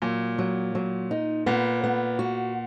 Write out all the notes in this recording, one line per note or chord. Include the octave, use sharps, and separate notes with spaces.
A#2 F#3
F#3
F#3
D#4
A#2 B3
B3
F#4